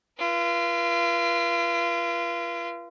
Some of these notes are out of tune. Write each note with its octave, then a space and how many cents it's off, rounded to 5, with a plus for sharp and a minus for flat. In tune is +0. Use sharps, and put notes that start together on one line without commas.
F4 -35 B4 -40